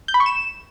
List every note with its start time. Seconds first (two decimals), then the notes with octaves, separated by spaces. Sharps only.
0.08 G6
0.14 B5
0.20 C#6
0.26 E7